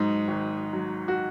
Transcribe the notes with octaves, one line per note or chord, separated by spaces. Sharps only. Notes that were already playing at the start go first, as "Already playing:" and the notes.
Already playing: G#2 F#3 D#4
G#1
F#3
F#4